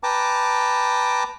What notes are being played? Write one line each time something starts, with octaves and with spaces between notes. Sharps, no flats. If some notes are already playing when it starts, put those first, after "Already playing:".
B4 G5 A5 A#5 D6